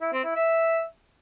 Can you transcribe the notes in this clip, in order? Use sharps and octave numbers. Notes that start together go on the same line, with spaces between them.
E4
C4
E4
E5